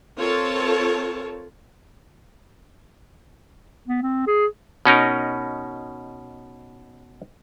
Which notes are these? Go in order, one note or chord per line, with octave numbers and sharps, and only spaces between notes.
C4 F4 A4 A#4 C#5 A5
B3
C4
G#4
B2 C#4 D#4 A#4